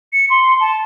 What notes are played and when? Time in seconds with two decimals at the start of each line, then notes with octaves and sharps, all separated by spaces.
0.13 C#7
0.30 C6
0.60 A5